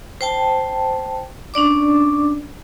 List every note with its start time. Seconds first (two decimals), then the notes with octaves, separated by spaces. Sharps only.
0.21 C5 G5 A5
1.54 C#4 D4 D5 D6